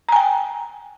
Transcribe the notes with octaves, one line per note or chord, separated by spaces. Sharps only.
G5 G#5 A#5